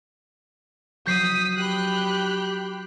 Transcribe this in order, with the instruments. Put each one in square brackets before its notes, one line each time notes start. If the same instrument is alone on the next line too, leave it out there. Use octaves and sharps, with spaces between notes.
[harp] F#3 [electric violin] D#6 B6 [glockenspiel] G6 C7
[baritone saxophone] G4 [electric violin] B5 F#6